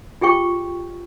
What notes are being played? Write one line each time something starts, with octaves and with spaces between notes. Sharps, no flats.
F4 G4 G#4 G5 C#6